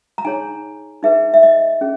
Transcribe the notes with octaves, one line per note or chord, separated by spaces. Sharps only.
A#5
D#4 G#4 C#5 G#5
D#4 G#4 B4 E5
E5
D#5
C#4 G#4